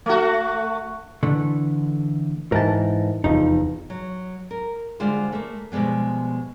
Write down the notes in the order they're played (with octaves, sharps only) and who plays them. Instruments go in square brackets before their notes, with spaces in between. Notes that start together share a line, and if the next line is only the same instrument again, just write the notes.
[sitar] A3 F#4
[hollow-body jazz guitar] D3 E3 A3
[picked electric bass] G#2 E3 [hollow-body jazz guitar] A#4 A5
[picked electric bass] F1 E2 F3 [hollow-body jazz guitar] D#4
[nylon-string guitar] F#3
A#4
D3 G3 G#3 F4 C5
A3 A#3
B2 F3 G3 G#3 B3